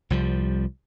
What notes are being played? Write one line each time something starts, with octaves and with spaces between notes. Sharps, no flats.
C2 F3 G3